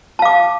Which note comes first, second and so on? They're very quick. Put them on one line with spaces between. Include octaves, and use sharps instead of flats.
A5 F5 D6